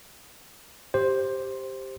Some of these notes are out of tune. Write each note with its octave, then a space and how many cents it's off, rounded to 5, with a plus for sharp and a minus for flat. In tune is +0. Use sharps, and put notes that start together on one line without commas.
G4 +0 C5 +10